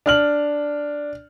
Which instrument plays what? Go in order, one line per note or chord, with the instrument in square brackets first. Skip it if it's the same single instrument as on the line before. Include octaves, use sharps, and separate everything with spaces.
[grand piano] D4 F6 F#7